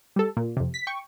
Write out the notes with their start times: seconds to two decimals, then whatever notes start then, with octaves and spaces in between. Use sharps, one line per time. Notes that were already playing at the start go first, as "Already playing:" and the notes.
0.16 G3 A4
0.37 A#2
0.57 F2 C3
0.74 B6
0.87 G5 C#6